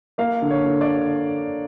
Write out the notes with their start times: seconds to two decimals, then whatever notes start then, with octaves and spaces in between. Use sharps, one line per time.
0.18 A#3 F5
0.42 D3
0.51 C#5
0.66 D3
0.81 D5